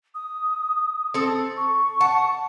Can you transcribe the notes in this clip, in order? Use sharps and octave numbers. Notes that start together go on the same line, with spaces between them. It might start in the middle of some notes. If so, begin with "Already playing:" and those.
D#6
C4 A4
C#6
F#5 A5